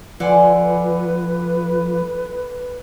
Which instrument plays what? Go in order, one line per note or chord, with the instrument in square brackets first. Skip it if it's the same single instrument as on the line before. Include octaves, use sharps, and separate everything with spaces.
[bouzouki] D3 [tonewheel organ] F3 [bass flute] B4 [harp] F#5 G#5 C6